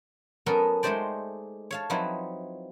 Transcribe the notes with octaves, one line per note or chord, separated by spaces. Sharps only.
F#3 B3 C#4 A4 A#4 D#5
G#3 A3 D#4 G4 C5 D5
C#5 F5 A5
F3 F#3 C4 D#4 E4 B4